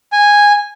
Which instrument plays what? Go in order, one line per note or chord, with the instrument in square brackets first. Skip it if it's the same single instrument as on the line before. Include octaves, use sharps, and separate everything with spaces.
[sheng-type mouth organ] G#5